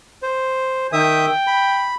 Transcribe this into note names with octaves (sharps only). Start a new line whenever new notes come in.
C5
D#3 E5 G5 D#6
B5